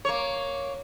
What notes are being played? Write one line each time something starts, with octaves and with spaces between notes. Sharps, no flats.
A#3 C#5